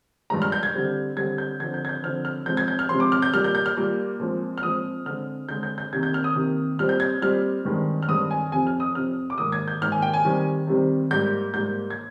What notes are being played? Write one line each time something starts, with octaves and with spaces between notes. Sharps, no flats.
G2 F3 G#3 A#5
F6
G6
G#6
D3 G3 C4
D3 G3 C4 G#6
G6
D3 F3 C4 G#6
G6
G#6
G6
D3 F3 C4 F6
F6
C3 F3 G#3 C4 G6
G#6
G6
F6
C3 F3 G#3 C4 C6
D6
F6
G6
A#2 G3 A#3 F6
G6
G6
F6
A#2 G3 A#3
A#2 F3 G#3 C4
F6
A#2 F3 G#3 C4 D#6
D3 G#3 C4 F6
D3 G#3 C4 G6
G6
G6
C3 D#3 A#3 G#6
G6
F6
D#6
C3 D#3 A#3
A#2 G3 C4 F6
G6
G#6
A#2 G3 C4 F6
G2 D#3 G#3 C4
F6
G2 D#3 G#3 C4 D#6
G#5
F2 C3 F3 C4 G#5
F6
D#6
F2 C3 F3 C4 F6
D6
G#2 D#3 A#3 D#6
G#6
G6
G#2 D#3 A#3 F6
G#5
G5
G#5
C3 D#3 G3 C4
C3 D#3 G3 C4
G#2 G3 A#3 G6
G#2 G3 A#3 G6
G#6